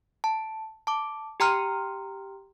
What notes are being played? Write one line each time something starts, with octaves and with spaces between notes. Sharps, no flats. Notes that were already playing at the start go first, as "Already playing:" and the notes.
A5
A5 D6
G4 G5 A#5 C6 F6 C#7